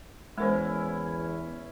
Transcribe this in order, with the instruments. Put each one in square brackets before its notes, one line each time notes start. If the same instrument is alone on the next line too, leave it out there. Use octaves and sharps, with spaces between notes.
[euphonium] E2 [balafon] G#3 A#4 C5 [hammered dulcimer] C#4 E4